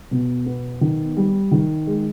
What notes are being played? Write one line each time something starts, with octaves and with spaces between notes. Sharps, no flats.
B2
B3
D#3
G3
D#3
G#3